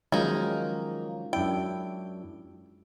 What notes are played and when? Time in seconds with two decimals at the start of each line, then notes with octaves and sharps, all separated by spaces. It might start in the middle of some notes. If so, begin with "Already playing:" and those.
0.12 D#3 F3 F#3 G#3 A#3 C#4 D#4 F4
1.33 F#2 D4 E4 G5